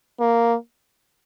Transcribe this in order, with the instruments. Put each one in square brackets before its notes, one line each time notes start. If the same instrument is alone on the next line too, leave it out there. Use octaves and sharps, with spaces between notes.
[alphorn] A#3